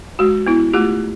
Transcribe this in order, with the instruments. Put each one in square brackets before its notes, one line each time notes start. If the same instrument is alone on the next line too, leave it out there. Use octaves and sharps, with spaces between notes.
[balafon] G#3 F#4
B3 E4
A3 F4 G4